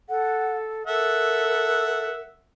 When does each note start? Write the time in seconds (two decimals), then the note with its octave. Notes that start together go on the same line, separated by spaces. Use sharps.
0.09 A4 F#5
0.87 A4 A#4 E5 F#5